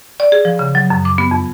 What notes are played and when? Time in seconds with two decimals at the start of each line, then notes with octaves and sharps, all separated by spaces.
0.20 D5
0.32 G#4
0.45 F3
0.59 C#3
0.75 F#3
0.90 F#2
1.05 D6
1.18 B3
1.31 F2